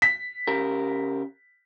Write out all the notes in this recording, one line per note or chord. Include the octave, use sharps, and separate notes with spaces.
B6
C#3 G4 A#4